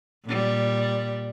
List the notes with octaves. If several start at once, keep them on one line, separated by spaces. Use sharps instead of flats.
A#2 G3